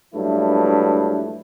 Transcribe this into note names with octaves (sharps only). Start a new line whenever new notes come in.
A#1 G2 F#3 A3 E4 B4